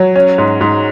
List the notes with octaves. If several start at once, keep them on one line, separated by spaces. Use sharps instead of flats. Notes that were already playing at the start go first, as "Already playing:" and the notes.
Already playing: F#3
C#4
G#2
G#2